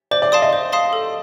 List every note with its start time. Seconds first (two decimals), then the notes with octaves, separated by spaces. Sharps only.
0.11 C5 D5
0.22 D5
0.32 D5 F5 A5 C6 D#6
0.42 D#5
0.53 C5
0.72 F5 A5 C6 D#6
0.93 A4